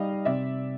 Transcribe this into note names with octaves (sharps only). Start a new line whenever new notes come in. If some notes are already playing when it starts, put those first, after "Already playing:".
Already playing: G3 D#4 D#5 F5
C3 D5 E5